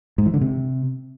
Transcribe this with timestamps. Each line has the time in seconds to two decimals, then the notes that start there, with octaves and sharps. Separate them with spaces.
0.18 G#2
0.26 E3
0.34 D3
0.41 C3